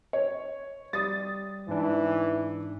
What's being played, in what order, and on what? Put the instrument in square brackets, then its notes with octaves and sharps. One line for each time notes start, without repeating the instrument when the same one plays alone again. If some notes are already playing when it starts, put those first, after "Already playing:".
[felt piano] C#5
[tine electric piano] G3 [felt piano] D#6 A6
[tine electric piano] G#2 D4 [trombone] E3